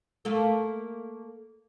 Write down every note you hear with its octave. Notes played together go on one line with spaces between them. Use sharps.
A3 A#3 A4